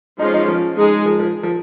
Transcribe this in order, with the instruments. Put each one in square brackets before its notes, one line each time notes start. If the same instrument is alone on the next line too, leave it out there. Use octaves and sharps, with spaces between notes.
[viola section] F3 G#3 C#4 F4 [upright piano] D#4
[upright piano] D#4
F3
[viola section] G#3 D#4 G#4
[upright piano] F3
F3
F3